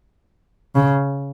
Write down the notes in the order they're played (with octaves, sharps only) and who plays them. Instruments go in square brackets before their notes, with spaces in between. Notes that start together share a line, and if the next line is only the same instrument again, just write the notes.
[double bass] C#3